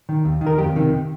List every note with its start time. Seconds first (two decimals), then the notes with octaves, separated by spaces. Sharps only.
0.09 D#3
0.25 D#2
0.41 D#3
0.47 A#4
0.58 F2 G4
0.76 C3 D#3